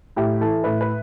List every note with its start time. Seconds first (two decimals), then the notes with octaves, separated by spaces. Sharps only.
0.16 A2 G4
0.41 E3 A4
0.64 A2 B4
0.81 B4